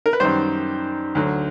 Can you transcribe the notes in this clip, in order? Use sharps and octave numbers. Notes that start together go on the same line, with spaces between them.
A#4
B4
F#2 D#3 G3 C5
D2 D3 F#3